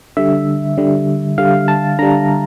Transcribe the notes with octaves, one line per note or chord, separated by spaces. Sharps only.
D3 G3 E5
D3 G3
D3 G3 F5
A5
D3 G3 A#5